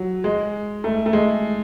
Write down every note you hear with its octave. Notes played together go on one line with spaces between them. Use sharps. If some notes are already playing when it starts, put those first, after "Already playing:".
Already playing: F#3
G#3
A3
A3
G#3